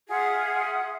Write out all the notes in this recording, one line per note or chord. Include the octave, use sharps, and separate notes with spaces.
F4 G#4 E5 F#5